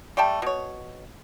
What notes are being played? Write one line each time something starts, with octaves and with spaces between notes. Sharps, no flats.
G3 A3 G5 A5
B2 C#5